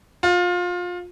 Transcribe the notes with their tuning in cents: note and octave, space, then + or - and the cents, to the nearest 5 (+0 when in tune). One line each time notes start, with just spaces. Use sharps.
F4 +25